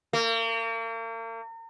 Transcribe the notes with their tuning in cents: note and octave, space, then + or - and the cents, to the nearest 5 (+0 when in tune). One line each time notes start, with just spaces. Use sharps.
A#3 -40